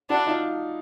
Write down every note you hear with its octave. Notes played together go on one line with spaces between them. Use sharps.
D4 E4 F#4
D#4 F4